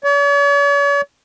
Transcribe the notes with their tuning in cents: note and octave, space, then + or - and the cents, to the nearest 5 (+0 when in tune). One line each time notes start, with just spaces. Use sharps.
C#5 +45